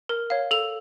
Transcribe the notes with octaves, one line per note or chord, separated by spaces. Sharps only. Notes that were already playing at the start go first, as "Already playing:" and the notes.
A#4
C#5 F5
A4 F7